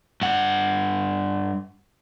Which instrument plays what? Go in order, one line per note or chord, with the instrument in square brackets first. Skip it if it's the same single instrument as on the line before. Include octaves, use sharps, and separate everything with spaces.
[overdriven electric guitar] G2 F#5